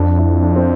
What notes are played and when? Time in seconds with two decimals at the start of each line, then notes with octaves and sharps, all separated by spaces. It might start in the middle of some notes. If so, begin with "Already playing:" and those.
Already playing: F2 D4
0.18 E4
0.43 D4
0.56 C4